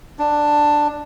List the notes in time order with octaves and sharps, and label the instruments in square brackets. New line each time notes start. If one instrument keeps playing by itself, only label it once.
[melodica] D4